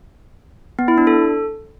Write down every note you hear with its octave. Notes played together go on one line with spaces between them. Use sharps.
B3
E4
D4
A4